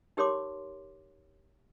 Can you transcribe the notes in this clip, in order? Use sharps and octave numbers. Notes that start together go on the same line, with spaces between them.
D#4 G4 A#4 C#5 C6 D6